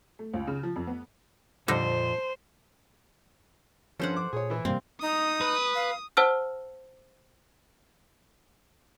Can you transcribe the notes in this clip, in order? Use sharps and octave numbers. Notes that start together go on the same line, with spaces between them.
A3
C#2
C#3
F3
F2
B3
F2 A#2 D3 G3 D#4 C5
G2 F3 C#4 A4 C5 F#5
D6
A#2 G#4 C#5
E3 E4
G2 C3 G3 A#3 C4 F5
D#4 D#6
B4
F5
C5 F#5 A5 E6 F6